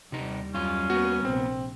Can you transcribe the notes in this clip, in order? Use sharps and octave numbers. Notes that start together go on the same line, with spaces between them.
D#2 C3 G3 D#4
F#2 C#4 F4
A#3 B3 F#4
A#1 C3 C4